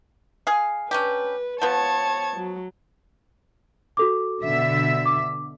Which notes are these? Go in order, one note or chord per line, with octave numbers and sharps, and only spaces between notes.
G#4 F5
C#4 D4 G4 B4
F3 B3 C#5 A5 G#6
F#3
F#4 A4 D6
B2 D3 E5
D6